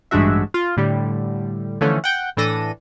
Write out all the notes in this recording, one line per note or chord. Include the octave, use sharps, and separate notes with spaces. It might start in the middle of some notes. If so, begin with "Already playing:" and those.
A1 G2 G#3 D4 F#4 E5
F4
A2 D3 G3
D3 E3 F3 A3 C#4
F#5 G5 G6
A2 E3 D4 A4 A#6 D#7